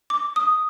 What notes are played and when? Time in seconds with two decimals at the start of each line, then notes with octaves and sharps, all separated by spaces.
0.10 D6
0.36 D#6